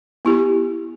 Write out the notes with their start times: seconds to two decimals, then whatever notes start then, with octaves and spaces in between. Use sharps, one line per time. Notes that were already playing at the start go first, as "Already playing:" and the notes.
0.25 B3 E4 G4